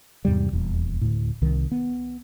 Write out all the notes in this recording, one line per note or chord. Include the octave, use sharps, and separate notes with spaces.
E2 G#2 C3 G3
D#1 E2
D2 A2
C2 D#3
B3